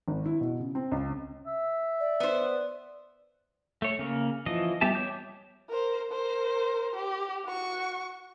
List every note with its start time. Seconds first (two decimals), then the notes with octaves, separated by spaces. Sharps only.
0.08 G#1
0.26 E4
0.41 B2
0.60 C#3
0.75 C4
0.92 C#2
1.47 E5
2.00 D5
2.20 B3 C5
3.82 A3 C#5
3.99 C#3 A#3
4.46 E3 F3 D#5
4.81 G3 B3 G4 E5 A5
4.95 C#5 D6 G6
5.69 A#4 C5
6.12 A#4 C5
6.96 G4
7.45 F#4 C#6